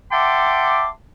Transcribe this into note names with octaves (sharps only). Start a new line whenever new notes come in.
E5 F#5 G5 A5 C6 D6